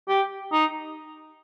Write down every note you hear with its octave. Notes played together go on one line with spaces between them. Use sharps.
G4
D#4